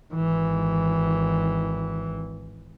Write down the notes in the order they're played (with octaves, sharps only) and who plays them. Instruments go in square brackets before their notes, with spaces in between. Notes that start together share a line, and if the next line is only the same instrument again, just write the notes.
[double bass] G#1 E3